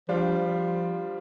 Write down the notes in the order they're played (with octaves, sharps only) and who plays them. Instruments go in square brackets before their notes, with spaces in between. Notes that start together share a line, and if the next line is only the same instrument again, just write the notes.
[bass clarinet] F3 [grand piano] G3 D4 F4